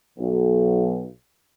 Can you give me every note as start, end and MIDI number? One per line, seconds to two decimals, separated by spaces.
0.18 1.05 35